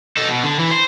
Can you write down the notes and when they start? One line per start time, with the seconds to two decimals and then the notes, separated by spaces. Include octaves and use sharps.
0.17 D#4 A4
0.29 B2
0.43 D3
0.59 E3
0.71 C5